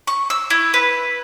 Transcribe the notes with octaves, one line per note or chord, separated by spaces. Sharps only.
C#6
E6
E4
B4